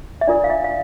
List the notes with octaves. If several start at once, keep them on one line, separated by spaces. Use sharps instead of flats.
E5
D4 F4 A#4 D5
F5
E5
F5